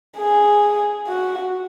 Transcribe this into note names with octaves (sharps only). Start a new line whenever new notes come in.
G#4
F#4